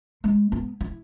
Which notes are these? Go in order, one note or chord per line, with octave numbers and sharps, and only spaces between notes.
G#3
B3
E4